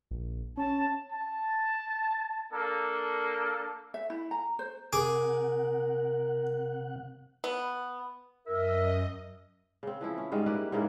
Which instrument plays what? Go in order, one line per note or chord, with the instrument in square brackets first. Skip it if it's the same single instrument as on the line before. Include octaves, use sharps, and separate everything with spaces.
[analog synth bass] A#1
[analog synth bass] C#4 [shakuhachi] A5
[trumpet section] A5
A#3 D4 A4
[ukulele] E5
E4
A#5
C5
[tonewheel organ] C3 F#5 [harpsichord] G#4 D6 [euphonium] A#4
[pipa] B3
[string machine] F#2 D#5 [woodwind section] A#4 E5
[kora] C#3 C4
E3 F3 E4
C#4
G#2 G3 G#3 F4
A#3 E4 G4 B4
G#2 C#3 E3 A#3